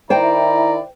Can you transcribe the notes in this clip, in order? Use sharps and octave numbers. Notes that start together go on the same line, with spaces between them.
D#3 E4 C5 D5 G5 A#5